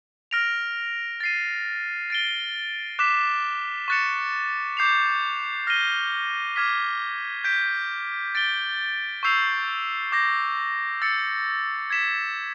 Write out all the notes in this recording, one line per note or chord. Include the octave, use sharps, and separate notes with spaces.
F6 A#6 D7 F7
A6 C7 D#7
A6 D7 G7
D6 F#6 B6 E7
C#6 F#6 A6 C#7 E7
D6 G6 C7 F7
F6 A#6 D#7 G7
D6 F6 G#6 B6
G6 B6 D7
A6 D7 G7
C#6 E6 G6 C7 F7
D6 G6 A#6
E6 A6 C#7
G#6 B6 E7